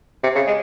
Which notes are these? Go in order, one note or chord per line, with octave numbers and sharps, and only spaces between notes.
C3
C#3
G#3